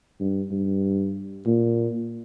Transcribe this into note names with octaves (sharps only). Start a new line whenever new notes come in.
G2
G2
A#2